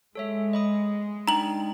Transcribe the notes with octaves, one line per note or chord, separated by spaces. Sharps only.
G#3 A4 C#5 E5
D#5 B5 D#6
D4 D#4 G5 A#5 F#7